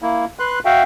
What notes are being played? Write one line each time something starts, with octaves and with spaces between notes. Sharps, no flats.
A#3 E4
B4 C6 F#6
F#4 E5 F5 G5